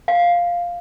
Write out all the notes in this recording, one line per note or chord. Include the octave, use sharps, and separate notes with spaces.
F5